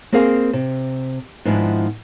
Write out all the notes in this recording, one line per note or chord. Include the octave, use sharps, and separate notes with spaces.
A#3 C4 G#4 A#4 F5
C3
G#2 D#3 F3 B3 D4 E4